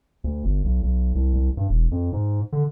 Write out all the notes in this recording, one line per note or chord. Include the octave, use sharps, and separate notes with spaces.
D2
G1
B1
B1
C2
C2
G2
E1
F2
G#2
D3